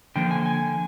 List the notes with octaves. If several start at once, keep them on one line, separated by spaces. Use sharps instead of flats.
D3 F3 A#3 G5
G#5
G#5